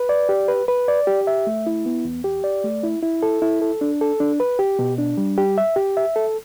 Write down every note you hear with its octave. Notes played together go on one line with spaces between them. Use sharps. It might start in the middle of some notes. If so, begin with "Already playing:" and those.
Already playing: B4
D5
G4
B4
B4
D5
G4
E5
A3
E4
B3
E2
G4
D5
A3
E4
E4
A4
E4
A4
D4
A4
D4
B4
G4
B2
D4
G3
G4
E5
G4
E5
A4